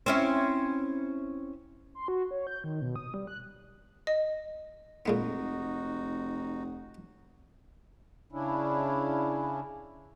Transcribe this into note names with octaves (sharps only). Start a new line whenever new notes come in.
C4 C#4 E4
C6
F#4
C#5
G6
D#3
B2
D#6
G3
F#6
D#5
F1 A#2 G#3 B3 D#4 F#4
C#3 C#4 D4 E4